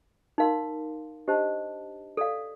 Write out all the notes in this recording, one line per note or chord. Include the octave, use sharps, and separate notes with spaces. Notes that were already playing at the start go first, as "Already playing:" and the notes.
D#4 A#4 F5 C6
D4 G4 C5 D#5 A5
A4 D5 F5